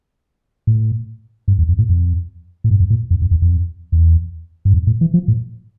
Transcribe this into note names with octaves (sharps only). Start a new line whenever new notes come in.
A2
G2
E2
F2
A2
F2
A2
G2
F2
A2
F2
F2
E2
F2
E2
G2
F2
A2
E3
F3
A2